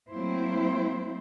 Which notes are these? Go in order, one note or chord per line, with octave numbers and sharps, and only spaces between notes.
F#3 A3 A#3 C4 E4 C5